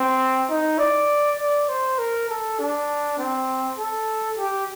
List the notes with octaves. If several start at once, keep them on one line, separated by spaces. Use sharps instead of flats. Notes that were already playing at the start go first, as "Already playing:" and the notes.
Already playing: C4
D#4
D5
D5
C5
A#4
A4
D4
C4
A4
G4